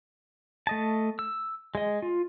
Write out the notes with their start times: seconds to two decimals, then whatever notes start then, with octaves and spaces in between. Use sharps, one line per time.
0.67 A3 D#5 A5
1.19 E6
1.75 G#3 D#5
2.02 F4